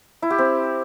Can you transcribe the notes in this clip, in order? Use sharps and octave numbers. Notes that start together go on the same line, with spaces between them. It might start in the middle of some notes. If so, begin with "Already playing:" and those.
E4
G4
C4